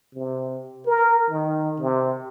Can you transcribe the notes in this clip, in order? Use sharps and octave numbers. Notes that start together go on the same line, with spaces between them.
C3
A#4
D#3
C3